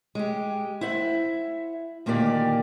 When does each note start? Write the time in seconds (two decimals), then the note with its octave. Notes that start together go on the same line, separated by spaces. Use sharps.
0.15 G#3 G4
0.81 E4 C5 E5 F#5
2.06 D2 A#2 D#3 A#3 G4 D5